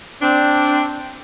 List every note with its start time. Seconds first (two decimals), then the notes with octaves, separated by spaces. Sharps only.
0.21 C4 D4